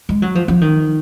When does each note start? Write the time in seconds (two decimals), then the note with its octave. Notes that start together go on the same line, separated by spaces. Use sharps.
0.09 G#3
0.22 F#3
0.35 F3
0.48 F3
0.61 D#3